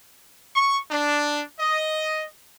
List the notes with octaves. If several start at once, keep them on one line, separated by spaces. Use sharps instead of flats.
C#6
D4
D#5